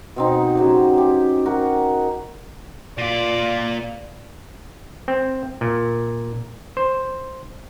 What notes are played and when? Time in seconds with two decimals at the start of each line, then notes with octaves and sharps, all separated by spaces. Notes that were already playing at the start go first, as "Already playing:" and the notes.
0.16 B2 C4 D#4
0.55 C#3 F#3 G4
0.98 G4
1.46 F#4 A#4
2.98 A#2 F4 D5
5.08 C4
5.61 A#2
6.77 C5